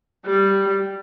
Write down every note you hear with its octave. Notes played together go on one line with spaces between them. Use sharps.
G3